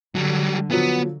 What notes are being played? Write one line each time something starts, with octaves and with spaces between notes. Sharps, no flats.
D3 F#3 G3
D3 F3 F#3 B3